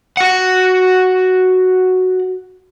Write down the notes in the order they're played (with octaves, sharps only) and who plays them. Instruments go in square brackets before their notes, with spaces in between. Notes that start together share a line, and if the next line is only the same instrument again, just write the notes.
[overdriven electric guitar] F#4 F#5